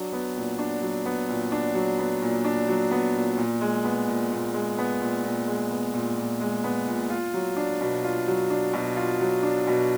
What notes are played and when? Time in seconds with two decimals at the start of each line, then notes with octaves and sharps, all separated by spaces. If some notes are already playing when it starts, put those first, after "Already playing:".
Already playing: F#3 D4
0.13 B3
0.36 A#2
0.59 D4
0.82 F#3
1.06 B3
1.29 A#2
1.52 D4
1.75 F#3
1.99 B3
2.22 A#2
2.45 D4
2.68 F#3
2.91 B3
3.15 A#2
3.38 A#2
3.61 G#3
3.85 B3
4.08 A#2
4.32 A#2
4.54 G#3
4.78 B3
5.00 A#2
5.24 A#2
5.48 G#3
5.71 B3
5.94 A#2
6.18 A#2
6.40 G#3
6.64 B3
6.87 A#2
7.10 F4
7.34 F#3
7.57 D4
7.81 B2
8.04 F4
8.28 F#3
8.50 D4
8.73 B2
8.97 F4
9.21 F#3
9.43 D4
9.67 B2